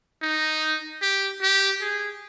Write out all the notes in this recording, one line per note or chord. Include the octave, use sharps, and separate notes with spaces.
D#4
G4
G4
G#4